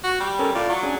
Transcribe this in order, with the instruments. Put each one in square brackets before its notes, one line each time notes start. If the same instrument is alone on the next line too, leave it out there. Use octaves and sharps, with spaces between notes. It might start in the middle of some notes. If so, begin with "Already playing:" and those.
[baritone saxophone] F#4
G3
[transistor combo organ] C#4 A4 A#4
[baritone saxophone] A2 [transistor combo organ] F4 D5
[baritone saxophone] F#3
[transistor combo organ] C#4 D4 G#4